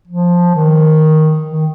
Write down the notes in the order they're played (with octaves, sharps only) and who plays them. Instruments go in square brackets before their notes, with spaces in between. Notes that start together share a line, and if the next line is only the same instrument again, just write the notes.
[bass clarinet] F3
D#3
D#3